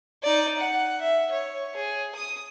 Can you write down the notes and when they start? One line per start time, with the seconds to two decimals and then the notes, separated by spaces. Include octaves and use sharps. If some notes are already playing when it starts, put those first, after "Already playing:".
0.23 D#4 D5
0.58 F#5
1.01 E5
1.31 C#5
1.76 G#4
2.15 D#6